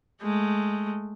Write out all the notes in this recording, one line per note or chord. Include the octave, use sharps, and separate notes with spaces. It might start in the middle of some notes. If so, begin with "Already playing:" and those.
G#3 A3